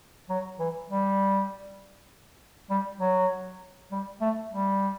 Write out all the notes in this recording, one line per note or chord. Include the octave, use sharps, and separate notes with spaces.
F#3
E3
G3
G3
F#3
G3
A3
G3